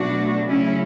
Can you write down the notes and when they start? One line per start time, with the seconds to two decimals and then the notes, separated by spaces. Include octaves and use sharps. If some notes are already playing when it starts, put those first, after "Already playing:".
Already playing: B2 F#3 A3 D4 F#4
0.47 C#3 F#3 A3 C#4 E4